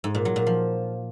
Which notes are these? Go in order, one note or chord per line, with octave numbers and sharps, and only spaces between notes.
G#2
A#2
F#3
A#2
F3